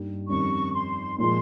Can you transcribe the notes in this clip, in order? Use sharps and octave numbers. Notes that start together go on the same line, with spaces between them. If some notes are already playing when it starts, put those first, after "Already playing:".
Already playing: G2 G3 A#3 D#4
F2 D#3 G3 C#4 C#6
C6
A#2 F3 G#3 C6